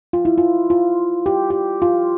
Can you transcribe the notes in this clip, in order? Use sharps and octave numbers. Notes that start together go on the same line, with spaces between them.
F4
E4
F4
F4
G4
G4
F4